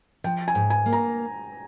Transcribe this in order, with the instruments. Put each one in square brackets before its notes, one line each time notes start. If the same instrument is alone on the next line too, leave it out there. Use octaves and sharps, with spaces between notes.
[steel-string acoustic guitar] F3 [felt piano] G5
[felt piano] G#5
[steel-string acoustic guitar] G#2
[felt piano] G#5
[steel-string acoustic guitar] A#3
[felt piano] A#5